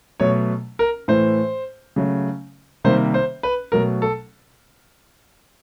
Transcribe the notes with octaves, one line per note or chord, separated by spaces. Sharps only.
B2 F#3 A3 C#5
A#4
A2 E3 A3 C5
C#3 F#3 A3
C3 D#3 G3 A#3 C5
C5
B4
B2 F#3 A3 A#4
A4